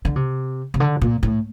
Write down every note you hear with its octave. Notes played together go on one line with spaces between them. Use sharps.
D3
C3
C3
D3
A#2
A2